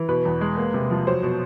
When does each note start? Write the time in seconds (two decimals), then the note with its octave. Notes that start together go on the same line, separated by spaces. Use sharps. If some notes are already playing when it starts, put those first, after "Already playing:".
Already playing: E3
0.09 B2 B4
0.25 E2
0.41 G#3
0.57 A#3
0.74 C3
0.91 F3
1.07 F#3 C5
1.23 B2